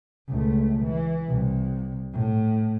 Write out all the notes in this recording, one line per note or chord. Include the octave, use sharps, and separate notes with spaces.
C#2 A3
E3
C2
A2